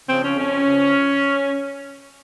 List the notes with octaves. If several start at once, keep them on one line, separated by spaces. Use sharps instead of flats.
C#3 F3 C4
C#4
F2 C#4
C#3 F3